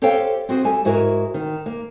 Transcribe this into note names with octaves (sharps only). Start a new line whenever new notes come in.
G4 A4 C5 C#5 F5 G5
C4 F#4 G#4
G3 A4 G#5
G#2 E4 F#4 G#4 A#4
D#3
A#3